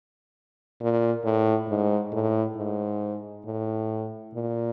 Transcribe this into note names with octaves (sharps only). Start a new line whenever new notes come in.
A#2
A2
G#2
A2
G#2
A2
A#2